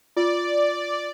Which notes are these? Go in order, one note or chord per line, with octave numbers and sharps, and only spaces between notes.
F4 D5